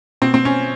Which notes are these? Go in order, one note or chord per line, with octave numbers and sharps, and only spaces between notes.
B2 C4
C4
C#4